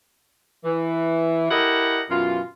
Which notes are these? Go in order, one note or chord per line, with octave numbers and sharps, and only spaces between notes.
E3
E4 G4 A4 A#4 D#5 F#5
F#2 B2 E3 F4